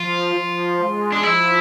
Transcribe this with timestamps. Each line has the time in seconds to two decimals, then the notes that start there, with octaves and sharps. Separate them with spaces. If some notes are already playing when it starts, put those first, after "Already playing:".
Already playing: F3 F4
0.36 F3
0.79 G#3
1.12 D4
1.23 F3 E4